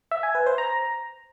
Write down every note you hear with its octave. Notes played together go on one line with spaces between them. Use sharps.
E5
G#5
B4
C5
A#5